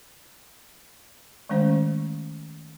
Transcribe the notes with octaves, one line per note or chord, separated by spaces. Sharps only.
D#3 G#3 A3 C#4 C5